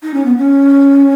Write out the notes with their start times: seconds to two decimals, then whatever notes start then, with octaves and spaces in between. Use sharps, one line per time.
0.03 D#4
0.14 C#4
0.25 B3
0.37 C#4